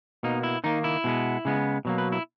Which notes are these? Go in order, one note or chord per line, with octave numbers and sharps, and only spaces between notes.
B2 A#3 D#4
E4
D#3 A#3 D#4
E4
B2 G#3 B3
C#3 G#3 B3
B2 F#3 A#3
B4
E4